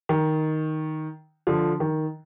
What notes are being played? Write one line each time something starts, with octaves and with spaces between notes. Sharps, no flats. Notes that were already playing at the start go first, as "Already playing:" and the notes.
D#3
D3 F3
D#3